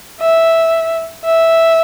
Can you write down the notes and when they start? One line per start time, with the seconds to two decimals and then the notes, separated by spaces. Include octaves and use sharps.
0.20 E5
1.25 E5